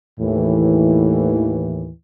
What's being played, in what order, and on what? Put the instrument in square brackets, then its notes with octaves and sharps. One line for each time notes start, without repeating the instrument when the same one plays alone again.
[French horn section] D#2 A2 E3